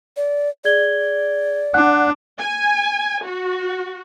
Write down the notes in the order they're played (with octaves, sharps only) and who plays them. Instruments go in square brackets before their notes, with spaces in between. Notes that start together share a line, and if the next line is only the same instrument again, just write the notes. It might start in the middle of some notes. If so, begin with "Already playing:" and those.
[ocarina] D5
[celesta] G#4 G#6 G7 [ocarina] D5
[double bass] D4 [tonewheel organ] F#5
[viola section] G#5
F#4